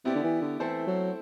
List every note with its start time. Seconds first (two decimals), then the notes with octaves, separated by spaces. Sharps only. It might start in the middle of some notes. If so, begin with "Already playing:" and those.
0.05 C3 B3 E4 G4 D5
0.15 D3
0.24 E3
0.42 D3
0.60 E3 A3 C4 E4 A4 C5
0.87 F#3